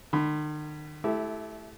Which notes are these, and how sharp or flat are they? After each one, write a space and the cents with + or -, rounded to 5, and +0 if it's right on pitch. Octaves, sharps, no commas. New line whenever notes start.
D#3 -45 B5 +25
A3 -25 E4 +0 G4 +0